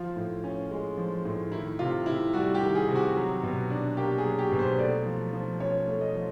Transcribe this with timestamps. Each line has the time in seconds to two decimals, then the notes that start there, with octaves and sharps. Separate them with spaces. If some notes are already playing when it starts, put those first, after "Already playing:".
Already playing: F3 F4
0.16 A2
0.44 C#4
0.71 G#3
0.98 F3
1.25 A2
1.52 D#3 E4
1.79 C3 F4
2.06 C3 E4
2.33 G3 F#4
2.55 G4
2.61 D#3
2.75 G#4
2.89 C3
2.95 F#4
3.16 F#3
3.43 B2
3.70 D4
3.97 A#3 G4
4.18 G#4
4.24 F#3
4.39 G4
4.51 B2
4.59 C5
4.78 A3 D5
5.06 F3
5.33 F3
5.60 C#4 C#5
5.87 A3
6.01 D#5
6.15 F3